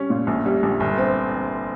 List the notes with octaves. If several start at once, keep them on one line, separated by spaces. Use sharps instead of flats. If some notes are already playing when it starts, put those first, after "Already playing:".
Already playing: G3 C#4
A#2
A#1
G3
A#1
G1
C4